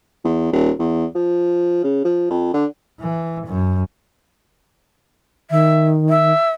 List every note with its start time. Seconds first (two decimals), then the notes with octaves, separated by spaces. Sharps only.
0.24 E2
0.52 D#1
0.79 E2
1.15 F3
1.84 C#3
2.04 F3
2.30 F2
2.54 D3
3.01 E3
3.47 F#2
5.51 D#3 E5
6.09 E5